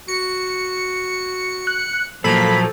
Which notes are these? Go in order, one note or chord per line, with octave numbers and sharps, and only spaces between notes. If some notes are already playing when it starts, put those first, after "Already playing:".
F#4 C#7
F#6
A#2 F3 F#3 A#3 A4 B5